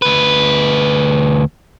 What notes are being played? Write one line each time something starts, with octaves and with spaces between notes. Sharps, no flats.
D2 B4